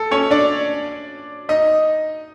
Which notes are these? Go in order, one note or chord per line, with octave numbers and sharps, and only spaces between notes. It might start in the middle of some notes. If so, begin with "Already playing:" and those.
Already playing: A4
C#4 C#5
D4 D5
D#4 D#5